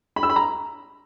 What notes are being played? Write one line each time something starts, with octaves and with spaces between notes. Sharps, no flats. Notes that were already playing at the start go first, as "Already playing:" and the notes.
B5
E6
B5
A#5